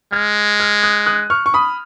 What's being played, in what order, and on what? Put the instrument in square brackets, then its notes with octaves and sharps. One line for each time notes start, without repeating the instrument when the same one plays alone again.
[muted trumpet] G#3 [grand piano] F6 G#6
[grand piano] F6 G#6
D#6 F#6
D#6 F#6
C#6 F6
C#6
B5 D#6